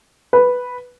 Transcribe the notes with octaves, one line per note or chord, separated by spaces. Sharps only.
B4